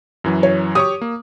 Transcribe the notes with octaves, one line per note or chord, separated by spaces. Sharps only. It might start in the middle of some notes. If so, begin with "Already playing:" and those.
F#2 E3 F#3
C#5
G4 C#5 C#6 D#6
A#3